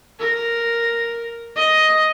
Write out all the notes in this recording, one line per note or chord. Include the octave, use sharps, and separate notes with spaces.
A#4
D#5